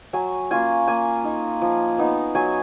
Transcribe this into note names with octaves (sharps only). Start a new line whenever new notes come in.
F#3 G#5
A#3 C#4 F4 G#5
A#3 G#5
D#4
F3
B3 D#4
F#3 G#5